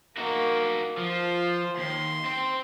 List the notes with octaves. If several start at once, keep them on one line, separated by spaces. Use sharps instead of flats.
A#3 D#4 F#4
F3 F4 C5
D#2 C6
C4 C5